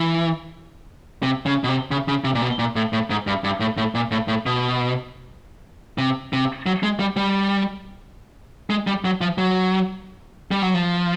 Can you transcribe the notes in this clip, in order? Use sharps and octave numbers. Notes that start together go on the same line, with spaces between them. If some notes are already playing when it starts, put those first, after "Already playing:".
Already playing: E3
C3
C#3
B2
C3
C#3
C#3
C3
A#2
B2
A#2
A2
A2
G#2
G2
G2
A2
A2
A#2
A2
A2
B2
C3
C3
F#3
G#3
G3
G3
G#3
G3
F#3
F3
F#3
G3
F#3
F3